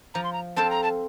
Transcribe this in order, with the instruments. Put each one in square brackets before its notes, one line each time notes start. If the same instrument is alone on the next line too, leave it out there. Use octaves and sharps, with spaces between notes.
[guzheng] F3 [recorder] A#5
[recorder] C6
A#5
[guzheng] C4 F4 A4 C5 [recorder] A5
[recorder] A#5
A5